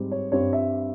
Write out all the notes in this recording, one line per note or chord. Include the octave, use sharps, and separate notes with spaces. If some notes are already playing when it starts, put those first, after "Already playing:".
Already playing: G#2 G3 C4
C#5
G2 G3 C4 C#5
E5